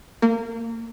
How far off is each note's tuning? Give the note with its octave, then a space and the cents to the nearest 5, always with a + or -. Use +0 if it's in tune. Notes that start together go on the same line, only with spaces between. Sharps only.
A#3 -25